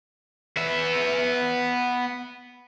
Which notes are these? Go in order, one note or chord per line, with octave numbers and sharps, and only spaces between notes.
B3 E5